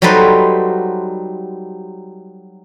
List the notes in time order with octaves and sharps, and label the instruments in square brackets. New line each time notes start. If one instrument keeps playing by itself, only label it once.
[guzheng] F#3 G3 D#4 A4 B4 C5